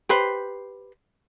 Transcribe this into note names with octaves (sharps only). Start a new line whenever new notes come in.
G4 B4 C5